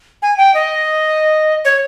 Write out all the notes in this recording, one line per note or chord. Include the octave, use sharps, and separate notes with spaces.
G#5
G5
D#5
C#5